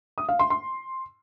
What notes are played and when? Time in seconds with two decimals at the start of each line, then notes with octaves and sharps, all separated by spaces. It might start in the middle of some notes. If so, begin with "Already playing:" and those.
0.18 D#6
0.29 F5
0.39 C6
0.50 C6